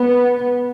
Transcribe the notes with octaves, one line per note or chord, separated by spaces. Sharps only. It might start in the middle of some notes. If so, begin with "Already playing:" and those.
Already playing: B3